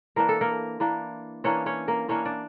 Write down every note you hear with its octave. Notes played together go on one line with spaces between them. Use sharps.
E3 A#3 D4 A#4
A4
A#3 A#4
E3 A#3 D4
E3 A#3 C#4 D4 C#5
C#4 C#5
A#3 A#4
E3 A#3 C#4 D4 C#5
D4 D5